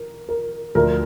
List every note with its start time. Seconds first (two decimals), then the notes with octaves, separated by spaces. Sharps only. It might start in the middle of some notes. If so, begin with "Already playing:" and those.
Already playing: A#4
0.29 A#4
0.75 D2 D3 F3 A#4